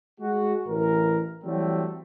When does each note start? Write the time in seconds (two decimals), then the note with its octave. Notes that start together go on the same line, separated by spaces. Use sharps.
0.20 G#3 F#4
0.68 A1 E3 A#4
1.44 E3 F#3 G3 A3 C4